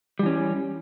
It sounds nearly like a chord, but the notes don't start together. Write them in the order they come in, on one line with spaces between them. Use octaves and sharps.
G3 E3 C#4